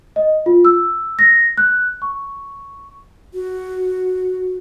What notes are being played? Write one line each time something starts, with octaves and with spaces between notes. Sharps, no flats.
D#5
F4
E6
A#6
F#6
C#6
F#4